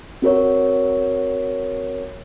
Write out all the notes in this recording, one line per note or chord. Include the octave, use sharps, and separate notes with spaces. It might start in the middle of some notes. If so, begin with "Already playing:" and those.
C4 F#4 A#4 C#5